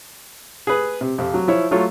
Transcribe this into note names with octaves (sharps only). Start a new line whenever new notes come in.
G#4 B4
C3
F2 C3
F#3
F3 E4 C#5
F#3 A3 F4 C#5